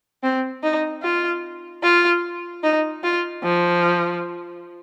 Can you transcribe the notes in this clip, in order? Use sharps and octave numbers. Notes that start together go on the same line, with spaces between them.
C4
D#4
F4
F4
D#4
F4
F3